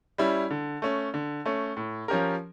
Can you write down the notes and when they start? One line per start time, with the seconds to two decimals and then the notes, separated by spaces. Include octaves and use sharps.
0.18 G3 C#4 E4
0.51 D3
0.82 A3 C#4
1.14 D3
1.46 A3 C#4
1.77 A2
2.08 F3 C#4 G4 A#4